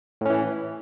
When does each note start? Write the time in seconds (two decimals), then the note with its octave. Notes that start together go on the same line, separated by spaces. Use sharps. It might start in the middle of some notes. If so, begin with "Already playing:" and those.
0.21 A2
0.25 C#4
0.30 E3